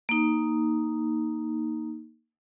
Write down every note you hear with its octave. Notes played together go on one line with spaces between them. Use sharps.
A#3 D#4